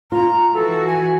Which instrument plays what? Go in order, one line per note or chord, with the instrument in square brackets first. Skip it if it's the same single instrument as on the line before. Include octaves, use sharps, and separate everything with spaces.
[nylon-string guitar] F4 [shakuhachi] A#5
[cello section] E3 F#4 [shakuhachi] A4
[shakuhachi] G#5